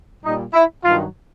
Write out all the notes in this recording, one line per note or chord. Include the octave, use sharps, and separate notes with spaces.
A#2 G3 D#4
E4
G2 D#3 F#3 F4